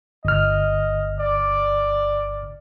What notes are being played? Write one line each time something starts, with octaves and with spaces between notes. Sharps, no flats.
G1 D#5 F6
D5